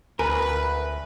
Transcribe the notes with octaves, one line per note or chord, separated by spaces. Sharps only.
D2 A#4 B4 G#5